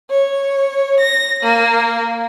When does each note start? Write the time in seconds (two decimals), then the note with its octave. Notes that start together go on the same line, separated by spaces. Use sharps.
0.10 C#5
1.00 A#6
1.44 A#3